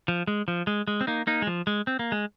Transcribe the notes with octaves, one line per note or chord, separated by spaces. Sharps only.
F3
G#3
F3
G#3
G#3
C4
A#3 D#4
A#3 D#4
G#3
F3
G#3
C4
A#3
G#3